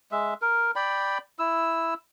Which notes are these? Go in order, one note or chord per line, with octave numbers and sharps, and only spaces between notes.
G#3 E5
A#4
D5 G5 B5
E4 E6